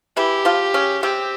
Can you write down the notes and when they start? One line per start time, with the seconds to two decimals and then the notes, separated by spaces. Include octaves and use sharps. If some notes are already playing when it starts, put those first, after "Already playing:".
0.17 E3 E4 G4
0.45 F3 F4
0.74 C#3 C#4
1.03 C3 C4 G4